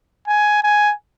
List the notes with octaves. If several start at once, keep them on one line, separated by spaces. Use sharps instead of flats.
G#5
G#5